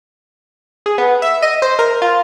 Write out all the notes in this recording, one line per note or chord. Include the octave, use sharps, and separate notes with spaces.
G#4
B3
E5
D#5
C5
A#4
F4